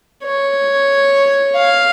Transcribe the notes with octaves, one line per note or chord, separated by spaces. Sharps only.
C#5
F5